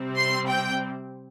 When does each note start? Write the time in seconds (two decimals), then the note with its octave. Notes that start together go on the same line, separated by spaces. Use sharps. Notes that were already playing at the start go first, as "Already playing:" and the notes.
Already playing: C3 G3 C4
0.16 C6
0.48 G5